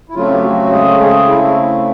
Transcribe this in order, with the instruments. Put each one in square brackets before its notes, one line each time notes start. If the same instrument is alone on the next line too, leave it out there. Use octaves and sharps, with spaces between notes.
[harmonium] E4
C#3 F#3 A3 C4 F4
G4
F#3 F#4
G#3 G#4
G#3 G#4
E4